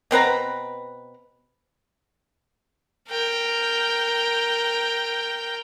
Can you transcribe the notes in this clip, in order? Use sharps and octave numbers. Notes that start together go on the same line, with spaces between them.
B2 C4 B4 A#5
A#4 G5